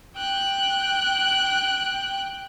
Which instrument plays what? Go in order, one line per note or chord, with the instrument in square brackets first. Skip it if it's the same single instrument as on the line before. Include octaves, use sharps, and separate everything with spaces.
[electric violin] G5 F#6